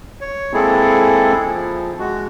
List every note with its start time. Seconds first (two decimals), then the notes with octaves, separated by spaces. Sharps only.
0.21 C#5
0.54 G#3 A#3 C4 E4 G#4 A4
1.44 F3
1.99 G#3 F#4